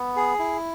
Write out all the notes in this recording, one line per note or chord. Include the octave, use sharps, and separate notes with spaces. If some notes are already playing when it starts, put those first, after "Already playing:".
Already playing: B3
G#4
E4